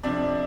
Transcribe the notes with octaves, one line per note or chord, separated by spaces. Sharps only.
F2 C3 F3 D4 D5